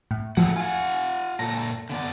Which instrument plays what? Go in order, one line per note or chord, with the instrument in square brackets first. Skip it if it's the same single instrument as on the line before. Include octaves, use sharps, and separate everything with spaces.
[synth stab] A2
[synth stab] A2 F3 F#3 [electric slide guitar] G#4 A4 F#5
[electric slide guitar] F4 F#5 [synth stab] G#5
[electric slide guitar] A#2 A4 [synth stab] A#6
[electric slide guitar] D3 B3 D5